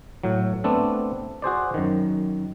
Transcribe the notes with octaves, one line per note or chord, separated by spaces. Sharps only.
A2 F#3
A3 B3 C4 D4 A4
F#4 G#4 C5 D5
F#2 D#3